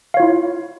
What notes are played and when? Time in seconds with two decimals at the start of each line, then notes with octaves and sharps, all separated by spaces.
0.14 F5
0.17 C#5
0.20 F4
0.22 E4